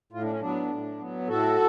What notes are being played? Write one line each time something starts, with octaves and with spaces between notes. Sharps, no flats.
A2 F4
D4
C#4
F#3 B3 D4
A2
F#3 B3
A2 F#4 A4